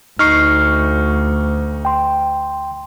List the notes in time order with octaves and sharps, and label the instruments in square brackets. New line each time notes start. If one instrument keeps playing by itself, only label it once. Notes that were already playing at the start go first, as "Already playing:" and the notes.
[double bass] D2 [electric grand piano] D#4 C#6 [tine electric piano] F6 C7
[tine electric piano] G5 C6